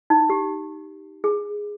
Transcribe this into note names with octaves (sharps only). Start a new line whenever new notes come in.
D#4
G4
G#4